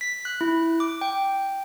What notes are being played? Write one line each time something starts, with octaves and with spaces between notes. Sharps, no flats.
B6
F#6
E4
D6
G5